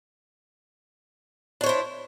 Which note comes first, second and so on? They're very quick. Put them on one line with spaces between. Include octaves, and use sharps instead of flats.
D4 C#5 C5 E4